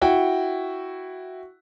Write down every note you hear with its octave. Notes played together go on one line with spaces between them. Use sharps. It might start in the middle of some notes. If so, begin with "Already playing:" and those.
E4 F#4 G5